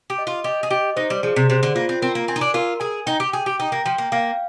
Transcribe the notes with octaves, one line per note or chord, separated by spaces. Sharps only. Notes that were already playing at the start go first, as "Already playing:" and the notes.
G4
D#5
F4
G4 D#5
G#4
G4 D#5
D#4 C5
G3
F3 G#4
C3
C3 C5
D3
A#3 F4
C4
C4 A#4
A#3
C4 G#5
D#4
D4
F4 A#4
G#4 G#5
D#4 G5
G4
G#4 G5
G4
D#4 G5
A#3
F3 G5
A#3
A#3 F5